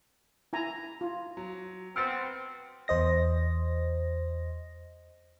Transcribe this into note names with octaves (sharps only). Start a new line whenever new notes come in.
E4 G#5 A#5
F4
F#3
B3 C4 F6 A6
E2 C5 D#5 A#6